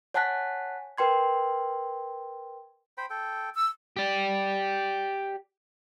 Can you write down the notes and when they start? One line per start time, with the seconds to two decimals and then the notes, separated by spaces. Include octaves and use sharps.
0.14 C#5 F#5 G#5 A5 F#6 B6
0.98 A#4 B4 G5 C6 G#6
2.98 C5 G5 B5
3.10 A4 G5
3.55 E6
3.97 G4 D5